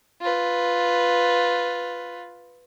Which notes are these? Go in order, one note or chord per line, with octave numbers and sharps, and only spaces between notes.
F4 B4